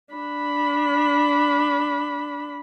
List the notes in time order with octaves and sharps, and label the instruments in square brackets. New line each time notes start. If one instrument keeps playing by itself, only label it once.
[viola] D4 B5